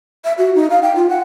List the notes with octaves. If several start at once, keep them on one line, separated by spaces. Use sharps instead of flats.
E5
F#4
D#4
F5
G5
F4
F#5